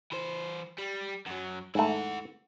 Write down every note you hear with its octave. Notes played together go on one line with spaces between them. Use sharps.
E3 C5
G3
F#2 F#3
G#2 A3 E4 F#5